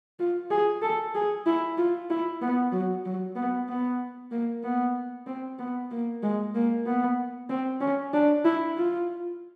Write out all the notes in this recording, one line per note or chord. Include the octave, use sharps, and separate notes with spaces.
F4
G#4
A4
G#4
E4
F4
E4
B3
F#3
F#3
B3
B3
A#3
B3
C4
B3
A#3
G#3
A#3
B3
C4
C#4
D4
E4
F4